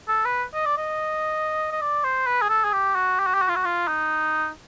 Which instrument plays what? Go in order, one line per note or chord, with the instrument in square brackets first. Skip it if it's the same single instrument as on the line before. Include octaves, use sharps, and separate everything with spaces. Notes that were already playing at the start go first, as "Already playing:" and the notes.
[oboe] A4
B4
D#5
D5
D#5
D#5
D5
C5
B4
G#4
A4
G#4
G4
F#4
G4
F#4
G4
F#4
F4
F#4
F4
D#4